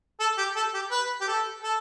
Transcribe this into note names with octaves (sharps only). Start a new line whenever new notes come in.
A4
G4
A4
G4
B4
G4
A4
A4